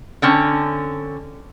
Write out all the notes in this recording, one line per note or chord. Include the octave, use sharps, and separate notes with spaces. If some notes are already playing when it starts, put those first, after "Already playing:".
D3 C4 C#4